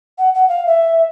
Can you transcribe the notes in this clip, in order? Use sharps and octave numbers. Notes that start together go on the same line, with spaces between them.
F#5
F#5
F5
E5